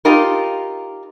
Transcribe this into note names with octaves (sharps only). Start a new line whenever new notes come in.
D#4 F4 G4 A#4